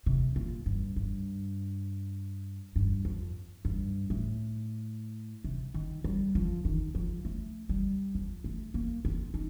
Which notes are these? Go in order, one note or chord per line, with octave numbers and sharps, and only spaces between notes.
C3
A#2
G2
G2
G2
F2
G2
A2
C3
D#3
G3
F3
D#3
F3
A3
G3
F3
A3
A#3
C4
D#4